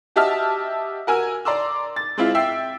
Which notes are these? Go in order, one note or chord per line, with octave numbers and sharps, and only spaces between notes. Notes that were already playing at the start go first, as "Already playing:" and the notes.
F#4 G4 D#5 E5 A5 F6
F#4 A#4 G#5 E6
D5 A#5 C6 D6 E6
A6
G#3 C4 E4 F4
E5 G5 E6 C7